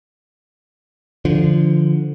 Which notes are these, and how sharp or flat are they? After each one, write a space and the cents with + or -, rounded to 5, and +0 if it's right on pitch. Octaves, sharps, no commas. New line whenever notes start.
D3 +0 F3 -20